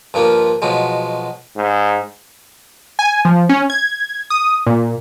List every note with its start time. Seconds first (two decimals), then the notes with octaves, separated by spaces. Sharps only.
0.14 G2 F3 A#3 F4
0.62 B2 F3 F#3 G#3
1.56 G#2
2.99 G#5
3.25 F3
3.49 C#4
3.70 G#6
4.30 D#6
4.67 A#2